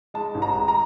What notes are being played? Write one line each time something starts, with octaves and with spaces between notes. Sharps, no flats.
G#3 A5
A1
A#5
G#3
A#5